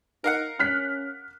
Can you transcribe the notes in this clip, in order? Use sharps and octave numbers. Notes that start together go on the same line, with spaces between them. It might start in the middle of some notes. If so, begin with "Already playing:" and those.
D#4 A#4 F5 F#5
C#4 F6 F#6 B6